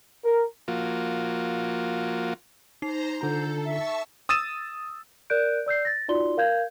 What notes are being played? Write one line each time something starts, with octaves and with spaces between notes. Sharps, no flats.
A#4
F3 A#3 F4 F#4
D#4 C5 A#5 C7
D3 F4 A4 A#5 G6
E5 A5 C#6 E6
D#6 E6 A6 D#7 E7
A#4 D5 F#6 G6 D7
D5 E6 G6 C7
A6 A#6
D#4 F4 F#4 D5 C6 G7
A#4 F5 G6 G#6